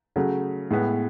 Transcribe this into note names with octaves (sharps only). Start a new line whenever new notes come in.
C#3 F#3 A3
A2 G#3 B3